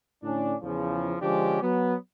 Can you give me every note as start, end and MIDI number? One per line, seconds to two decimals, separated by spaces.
0.23 0.55 45
0.23 0.55 50
0.23 0.55 61
0.23 0.55 62
0.62 1.16 40
0.62 1.16 49
0.62 1.16 53
1.21 1.60 50
1.21 1.60 53
1.21 1.60 56
1.21 1.60 61
1.21 1.60 62
1.21 1.60 67
1.62 1.95 54
1.62 1.95 59